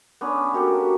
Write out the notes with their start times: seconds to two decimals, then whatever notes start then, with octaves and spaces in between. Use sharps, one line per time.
0.21 B3 C#4 D4
0.53 A#3 F#4 G4 A4